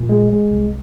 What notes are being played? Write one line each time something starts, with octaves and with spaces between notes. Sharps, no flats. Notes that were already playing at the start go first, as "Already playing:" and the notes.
Already playing: A#2
G#3
G#3
C2